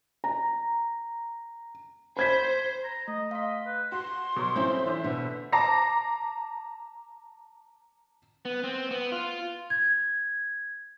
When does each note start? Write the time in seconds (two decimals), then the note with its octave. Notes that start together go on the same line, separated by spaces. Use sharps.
0.24 A#5
2.17 C5 B5 G#6 B6
2.84 A#5
3.08 A3 D#5
3.31 D#5 F5 C6 B6
3.66 B4
3.92 F#4 C6
4.36 B2 F#3
4.56 F2 C4 C#4 E4 G6
4.86 E3 D4 C5 E5
5.04 B2 D3
5.52 A5 A#5 D6 A#6 C7
8.45 B3
8.64 C4
8.91 B3
9.12 F4
9.70 G#6